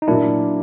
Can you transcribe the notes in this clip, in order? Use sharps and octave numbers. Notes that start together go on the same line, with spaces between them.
D#4
A#2 F#3 A#3 D4 E4